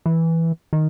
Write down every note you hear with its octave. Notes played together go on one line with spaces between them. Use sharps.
E3
D#3